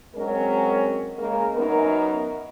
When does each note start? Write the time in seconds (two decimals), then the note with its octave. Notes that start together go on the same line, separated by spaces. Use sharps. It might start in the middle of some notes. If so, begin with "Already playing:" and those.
0.15 F#3 G#3 C4 C#4 A#4
1.18 C#3 G#3 A#3 A#4
1.54 F#2 B3 D#4 A#4